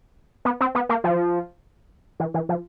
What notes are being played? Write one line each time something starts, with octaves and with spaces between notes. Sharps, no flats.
B3
C4
B3
A#3
F3
E3
E3
F3